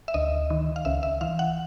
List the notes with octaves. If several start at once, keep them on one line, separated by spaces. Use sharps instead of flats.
E5
D2 D#5
D#3
F5
C#2 E5
E5
E3 F5
F#5